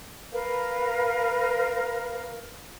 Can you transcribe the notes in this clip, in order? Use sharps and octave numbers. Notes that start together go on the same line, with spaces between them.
A#4 B4 F5